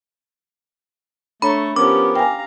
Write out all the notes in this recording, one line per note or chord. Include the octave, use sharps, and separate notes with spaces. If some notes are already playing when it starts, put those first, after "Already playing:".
A3 D4 A4 C#5 A#5 B5 C#6
F3 B3 C#4 G4 A#4 D6
F5 G5 G#5 A#5